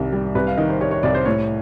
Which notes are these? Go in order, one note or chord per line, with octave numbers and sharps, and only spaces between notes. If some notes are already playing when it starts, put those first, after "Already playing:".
Already playing: C2 D#3 G3
G3
C2 B4
F5
D#3 D#5
C5
G3 C#5
C#5
C2 D5
C5
A2 C#5